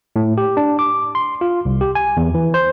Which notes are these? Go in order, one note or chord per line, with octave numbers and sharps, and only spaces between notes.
A2
G4
D4
D6
C6
F4
C2
G4
G#5
E2
E3
C5